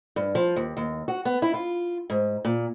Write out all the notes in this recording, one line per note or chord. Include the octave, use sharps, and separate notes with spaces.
G2
F3
D#2
D#2
F#4
B3
E4
F4
G#2
A#2